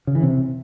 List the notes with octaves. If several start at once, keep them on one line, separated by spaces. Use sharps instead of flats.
C#3
E3
C3